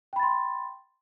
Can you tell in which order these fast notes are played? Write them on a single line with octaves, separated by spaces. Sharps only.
G5 B5 A6 C6